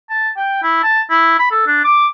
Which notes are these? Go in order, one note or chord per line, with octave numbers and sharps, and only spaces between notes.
A5
G5
E4
A5
E4
B5
A4
D4
D6